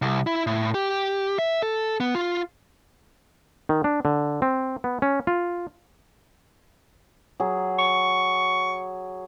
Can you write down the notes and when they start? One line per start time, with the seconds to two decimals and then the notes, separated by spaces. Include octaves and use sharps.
0.02 C2
0.27 E4
0.47 A2
0.74 G4
1.39 E5
1.62 A4
2.00 B3
2.15 F4
3.69 D#3
3.84 D4
4.05 D3
4.42 C4
4.84 B3
5.02 C#4
5.27 F4
7.40 F#3 G#4
7.79 C#6